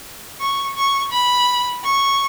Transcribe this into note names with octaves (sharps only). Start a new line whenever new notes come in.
C#6
C#6
B5
C#6